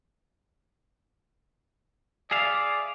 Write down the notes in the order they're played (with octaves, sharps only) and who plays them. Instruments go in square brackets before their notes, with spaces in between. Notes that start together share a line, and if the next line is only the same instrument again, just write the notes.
[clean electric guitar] G#4 E5 F5 [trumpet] D5